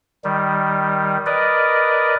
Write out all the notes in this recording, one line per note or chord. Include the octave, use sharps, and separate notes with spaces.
D#3 G3
A#4 B4 D5 D#5